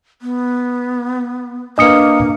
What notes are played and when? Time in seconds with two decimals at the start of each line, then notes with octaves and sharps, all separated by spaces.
0.22 B3
1.78 A#3 D4 B4 D#5 D#6 C#7